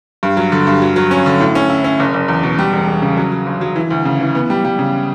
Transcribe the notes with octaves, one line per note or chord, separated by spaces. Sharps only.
G2
F#3
D3
G2
F#3
F#3
C#4
D3
A2
C#4
E4
C#4
F#1
F#1
E2
B2
G3
E1
E1
C#3
F#3
F#3
G1
F#3
E3
D2
C#3
E3
B3
G3
G3
C#3